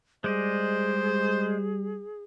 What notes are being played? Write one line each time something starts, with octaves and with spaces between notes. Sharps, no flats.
G3 G#3 G#4 C5 D5 D#5